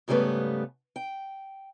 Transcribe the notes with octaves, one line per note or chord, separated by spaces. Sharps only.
G#2 C#3 G3 A3 B3 B4
G5